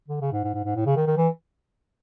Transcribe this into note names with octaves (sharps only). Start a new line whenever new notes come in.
D3
C#3
G#2
G#2
G#2
G#2
A2
C#3
D#3
D#3
E3